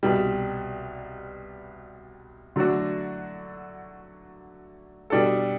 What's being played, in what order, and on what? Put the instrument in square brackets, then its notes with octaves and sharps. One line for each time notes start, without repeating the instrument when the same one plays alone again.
[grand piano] C2 B2 G3
D3 F#3 A3 D4 F#4
B2 G3 D4 A4